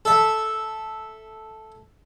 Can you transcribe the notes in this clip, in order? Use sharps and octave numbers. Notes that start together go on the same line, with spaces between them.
A4 E5